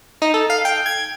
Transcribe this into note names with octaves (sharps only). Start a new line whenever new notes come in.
D#4
A4
F5
G5
G#6